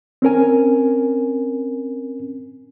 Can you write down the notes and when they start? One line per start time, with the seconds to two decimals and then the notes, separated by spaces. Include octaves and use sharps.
0.22 C4 C#4 A#4 G#5